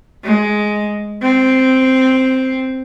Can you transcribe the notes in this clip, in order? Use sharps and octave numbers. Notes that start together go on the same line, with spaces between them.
G#3
C4